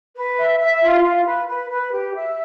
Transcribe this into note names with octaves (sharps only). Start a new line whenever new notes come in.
B4
E5
E5
F4
F4
B4
B4
B4
G4
E5